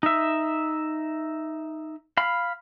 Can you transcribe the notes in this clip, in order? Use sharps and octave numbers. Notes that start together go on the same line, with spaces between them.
D#4 E5
F5 B5